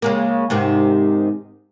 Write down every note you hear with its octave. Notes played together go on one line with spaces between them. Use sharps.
C#3 G#3 A#3
G#2 C3 D#3